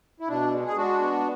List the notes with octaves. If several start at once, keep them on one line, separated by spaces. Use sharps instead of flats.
E4
B2 D4
G#3
G#4
G#3 D4 F#4
B3